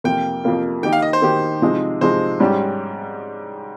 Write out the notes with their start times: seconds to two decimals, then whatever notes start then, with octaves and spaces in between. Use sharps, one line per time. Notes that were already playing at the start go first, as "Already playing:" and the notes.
0.04 F2 C3 F3 A#3 F4 G5
0.44 F2 C3 F3 A#3 F4
0.83 D#3 A#3 D#4 G4 G5
0.93 F5
1.02 D#5
1.13 C5
1.22 D#3 A#3 D#4 G4
1.62 C3 F3 G#3 D#4 G#4
2.01 C3 F3 G#3 D#4 G#4 C5
2.40 G#2 G3 C#4 G4